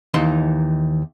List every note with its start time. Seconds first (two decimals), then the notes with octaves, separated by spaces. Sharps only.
0.14 D#2 E3 D#4 C6